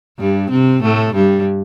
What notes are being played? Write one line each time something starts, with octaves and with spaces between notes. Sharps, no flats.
G2 G3
C3 C4
A2 A3
G2 G3